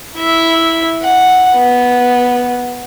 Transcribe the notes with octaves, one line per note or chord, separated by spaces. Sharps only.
E4 E5
F#5
B3